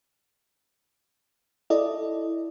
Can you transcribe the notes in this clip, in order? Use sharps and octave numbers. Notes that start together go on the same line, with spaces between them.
E4 A4 D5 D#5